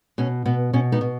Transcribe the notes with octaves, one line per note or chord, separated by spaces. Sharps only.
B2 C#4
B2 B3
B2 C#4
B3 D#4
B2